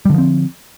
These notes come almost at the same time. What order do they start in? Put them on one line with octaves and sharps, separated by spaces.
G3 D3 F3 C4